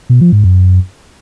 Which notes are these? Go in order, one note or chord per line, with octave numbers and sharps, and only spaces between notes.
B2
F3
G#2
F#2